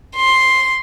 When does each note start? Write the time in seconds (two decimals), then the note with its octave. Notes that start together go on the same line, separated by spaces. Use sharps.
0.16 C6